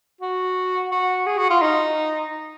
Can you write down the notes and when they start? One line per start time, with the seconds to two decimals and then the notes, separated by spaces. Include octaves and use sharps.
0.21 F#4
0.91 F#4
1.26 G#4
1.38 F#4
1.50 F4
1.61 D#4